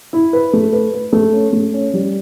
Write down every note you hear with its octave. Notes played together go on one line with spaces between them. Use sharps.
E4
B4
A3
B4
B4
A3
C#4
A3
C#4
G3